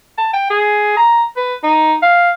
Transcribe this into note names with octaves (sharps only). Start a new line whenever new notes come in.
A5
G5
G#4
A#5
B4
D#4
F5